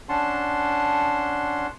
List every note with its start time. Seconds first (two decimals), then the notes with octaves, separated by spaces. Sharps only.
0.09 C#4 D4 F#5 A5 C6